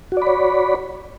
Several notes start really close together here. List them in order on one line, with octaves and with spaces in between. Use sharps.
F#4 D5 B5 C#5